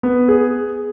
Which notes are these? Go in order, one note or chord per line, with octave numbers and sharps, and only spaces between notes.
B3
G#4